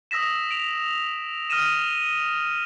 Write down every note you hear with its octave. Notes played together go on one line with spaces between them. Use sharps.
D#6 E6 A#6 B6 E7
D7 F7
D#6 F6 A#6 D#7 E7